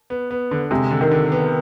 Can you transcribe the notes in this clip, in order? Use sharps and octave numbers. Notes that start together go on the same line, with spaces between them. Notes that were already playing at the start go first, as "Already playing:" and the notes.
B3
B3
D3
C3 G#3
D3
D#3
D3
B3